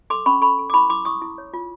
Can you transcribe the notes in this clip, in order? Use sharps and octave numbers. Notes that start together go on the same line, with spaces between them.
A4 C6 D6
C#4 B5 C#6
A4 B5 C#6
A4
D6
E4 B5 C#6
E4 C6 D6
E4 C#6 D#6
E4
C#5
F4